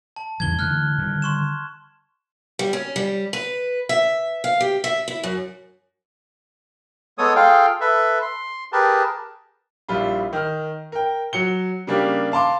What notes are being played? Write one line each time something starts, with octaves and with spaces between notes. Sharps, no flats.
A5
E2 C#3 E3 G#6 G7
D3 E3 A3 F6 F#6
D3 D#3 G3
C6 C#6 E7
G3
C#4
G3
B4
E5
F5
G4
E5
E4
F#2
G#3 B3 A4 C#5 D#6
F4 G#4 A4 F5 G5
A4 B4 E5
C6
G4 G#4 A#4 B4 A5
A#1 G3 E4 F4 B5
D#3 F6
A#4 G5
F#3 C#7 G7
C#3 G3 A#3 D4 G4
F5 A5 C6 D6